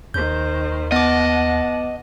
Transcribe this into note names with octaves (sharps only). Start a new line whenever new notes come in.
D#2 D#3 C5 G6
B3 D#5 F#5 A5 D6